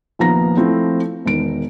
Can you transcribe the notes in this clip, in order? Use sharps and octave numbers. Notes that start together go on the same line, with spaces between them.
A#1 D#2 F3 B3 A#5 A#6
F3 A3 C4 E4
E1 D#3 D7